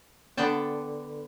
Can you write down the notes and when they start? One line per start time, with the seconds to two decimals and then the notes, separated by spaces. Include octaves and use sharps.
0.37 D3 B3 D5 G5 A5